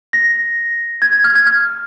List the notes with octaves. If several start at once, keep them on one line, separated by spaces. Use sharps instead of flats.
A#6
G#6
G#6
F6
G#6
F6